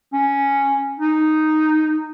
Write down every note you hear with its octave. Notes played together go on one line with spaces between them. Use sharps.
C#4
D#4